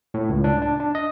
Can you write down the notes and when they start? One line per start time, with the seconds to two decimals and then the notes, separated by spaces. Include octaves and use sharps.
0.14 A2
0.29 C#2
0.44 D4
0.62 D4
0.80 D4
0.95 D#5